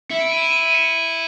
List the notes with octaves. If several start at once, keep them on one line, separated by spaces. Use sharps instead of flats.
E4 C#7
D7
D#7
E7
D#7
C#7